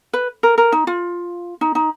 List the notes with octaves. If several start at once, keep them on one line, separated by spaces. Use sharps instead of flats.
B4
A#4
A#4
D#4
F4
D#4
D#4